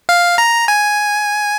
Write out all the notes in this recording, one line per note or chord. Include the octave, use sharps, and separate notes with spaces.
F5
A#5
G#5